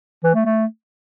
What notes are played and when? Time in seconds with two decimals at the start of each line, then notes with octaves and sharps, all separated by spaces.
0.24 E3
0.34 A3
0.45 A3